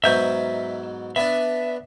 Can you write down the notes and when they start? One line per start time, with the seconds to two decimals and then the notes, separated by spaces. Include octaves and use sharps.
0.04 G#2 B2 F#3 E5 G6
1.16 B3 D4 E5